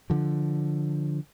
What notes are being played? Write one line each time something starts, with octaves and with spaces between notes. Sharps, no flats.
D3 F3